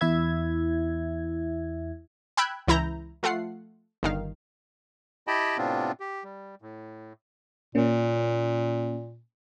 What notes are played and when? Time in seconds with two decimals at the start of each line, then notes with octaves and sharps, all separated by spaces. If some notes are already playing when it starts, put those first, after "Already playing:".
0.01 E2 E4 E5 G#6
2.37 G5 B5 E6 F#6 G#6
2.68 C#2 E3 E4 A#5 G6
3.23 F3 A3 F4 F#5 C7
4.03 G1 D#3 F5
5.27 E4 G4 D#5 G5 A5 B5
5.58 A2 C3 B3 C4 D4 F4
6.00 G4
6.24 G3
6.62 A2
7.75 A#2 A#3 C#4